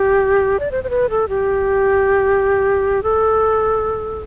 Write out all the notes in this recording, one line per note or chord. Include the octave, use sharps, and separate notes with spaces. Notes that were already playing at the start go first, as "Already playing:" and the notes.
Already playing: G4
D5
C5
C5
B4
A4
G4
A4